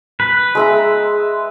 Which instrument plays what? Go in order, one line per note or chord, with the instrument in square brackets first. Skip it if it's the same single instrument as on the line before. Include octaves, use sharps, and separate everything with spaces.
[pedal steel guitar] B4
[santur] G#3 E5 A#5